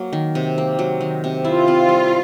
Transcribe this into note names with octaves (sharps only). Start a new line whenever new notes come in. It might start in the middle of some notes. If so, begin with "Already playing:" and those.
Already playing: F#3 A#3
D#3
C3
A#3
F#3
D#3
C3
E4 F4
C4
G3